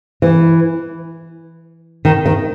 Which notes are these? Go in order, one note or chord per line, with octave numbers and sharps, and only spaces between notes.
E3
D#3
D#3